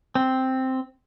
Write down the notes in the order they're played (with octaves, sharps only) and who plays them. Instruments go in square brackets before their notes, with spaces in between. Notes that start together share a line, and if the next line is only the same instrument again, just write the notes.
[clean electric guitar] C4